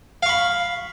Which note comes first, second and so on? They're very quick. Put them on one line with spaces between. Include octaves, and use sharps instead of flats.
F5 C#6 B5